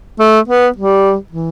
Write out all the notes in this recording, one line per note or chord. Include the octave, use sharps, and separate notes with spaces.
A3
B3
G3
E3